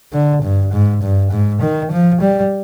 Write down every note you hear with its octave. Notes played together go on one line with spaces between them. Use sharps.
D3
G2
G#2
G2
G#2
D#3
F3
G3